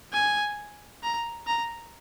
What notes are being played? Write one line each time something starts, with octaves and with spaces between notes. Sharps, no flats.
G#5
A#5
A#5